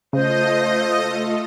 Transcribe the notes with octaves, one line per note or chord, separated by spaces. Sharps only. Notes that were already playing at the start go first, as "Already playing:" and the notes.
C#3 A3 F4 A4 C5 D#5